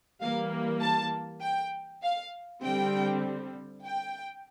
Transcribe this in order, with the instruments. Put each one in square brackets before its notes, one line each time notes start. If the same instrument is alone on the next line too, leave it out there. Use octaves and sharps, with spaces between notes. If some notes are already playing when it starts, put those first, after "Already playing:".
[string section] E3 G3 A#3 F5
A5
G5
F5
D3 G3 C4 G5
G5